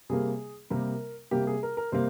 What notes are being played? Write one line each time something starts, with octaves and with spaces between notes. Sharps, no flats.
C3 G3 A#3 G#4
C3 G3 A#3 A#4
C3 G3 A#3 G4
G#4
A#4
A#4
C3 G3 A#3 C5